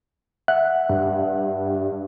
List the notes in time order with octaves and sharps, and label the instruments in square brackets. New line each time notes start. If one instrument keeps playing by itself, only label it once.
[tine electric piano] E5 F#5 F#6
[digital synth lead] G2